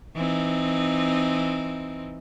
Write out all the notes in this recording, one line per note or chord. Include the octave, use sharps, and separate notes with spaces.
E3 C4 D#4